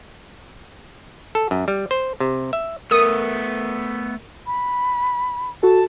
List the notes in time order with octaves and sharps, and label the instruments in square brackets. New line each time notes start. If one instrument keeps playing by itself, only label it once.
[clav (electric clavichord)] A4
F#2
G3
C5
C3
E5
[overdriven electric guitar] A3 B3 [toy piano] A#4 [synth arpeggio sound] D#6
[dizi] B5
[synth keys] F#4 A4 [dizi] A5